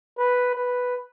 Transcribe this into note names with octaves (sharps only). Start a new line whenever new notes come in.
B4
B4